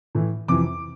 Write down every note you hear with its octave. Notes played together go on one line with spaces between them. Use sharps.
A2 E3
F2 C3 E3 D6